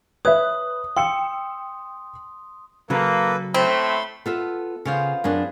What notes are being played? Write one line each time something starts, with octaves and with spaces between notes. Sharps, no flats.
B4 C#5 E5 D#6 F#6
G5 C6 E6 C#7
C#3 F#3 A#3 A4 B4
A2 A3 C4 B5 C6
B3 F4 A4 E5
C#3 B3 F4 C5
F#2 B3 D4 G#4